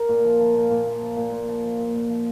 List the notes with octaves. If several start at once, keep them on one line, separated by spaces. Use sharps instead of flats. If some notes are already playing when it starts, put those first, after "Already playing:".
Already playing: A#4
A#2
F3
F3
A#2
A#2
F3
F3
A#2
A#2
F3
F3
A#2
A#2
F3